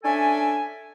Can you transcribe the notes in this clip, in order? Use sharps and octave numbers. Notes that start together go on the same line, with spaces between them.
C#4 D4 A4 E5 G#5